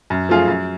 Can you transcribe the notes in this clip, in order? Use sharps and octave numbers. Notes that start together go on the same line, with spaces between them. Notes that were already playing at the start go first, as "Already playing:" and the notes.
F#2
F3 A3 F4 G#4
F#2